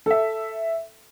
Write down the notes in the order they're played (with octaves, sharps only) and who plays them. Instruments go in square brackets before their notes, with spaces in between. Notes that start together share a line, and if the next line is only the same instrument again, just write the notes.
[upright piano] A4 E5